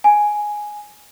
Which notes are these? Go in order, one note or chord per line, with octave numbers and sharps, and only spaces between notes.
G#5